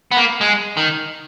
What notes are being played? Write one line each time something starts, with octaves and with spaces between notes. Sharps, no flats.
B3
A#3
G#3
D#3